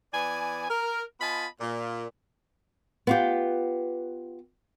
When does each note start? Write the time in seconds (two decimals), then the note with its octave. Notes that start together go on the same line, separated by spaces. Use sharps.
0.13 E3 B3 D5 G#5
0.70 A#4
1.20 B3 F4 D#5 G#5 A5 B5
1.60 A#2
3.07 B3 F4 G4